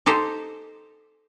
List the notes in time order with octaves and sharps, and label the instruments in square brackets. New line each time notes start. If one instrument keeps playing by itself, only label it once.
[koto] D#4 G4 A4 C5